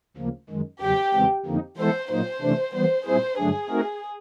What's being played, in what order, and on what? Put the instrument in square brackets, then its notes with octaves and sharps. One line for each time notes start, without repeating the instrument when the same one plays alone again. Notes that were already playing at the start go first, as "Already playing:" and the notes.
[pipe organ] D2 C#3 F3 A#3
F#2 D#3 G#3
[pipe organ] E2 C#3 F#3 [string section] G4
[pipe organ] E2 C#3 E3 G#3 C4
F2 D3 F3 A#3 D#4
[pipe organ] E3 G#3 B3 E4 A4 [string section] C5
[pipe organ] A#2 F#3 A#3 D#4 [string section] C5
[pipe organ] C3 E3 A3 D4
[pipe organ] E3 G3 B3 [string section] C5
[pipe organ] A#2 G3 C4 E4 G#4 [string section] C5
[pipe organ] G2 D3 F#3 A3 D4 [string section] G#4
[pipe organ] A3 C4 D#4 F#4 A#4